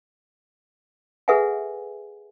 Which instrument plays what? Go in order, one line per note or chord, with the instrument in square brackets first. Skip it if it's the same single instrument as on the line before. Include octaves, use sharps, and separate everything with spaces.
[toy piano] G#4 A4 B4 E5 F#5 G#5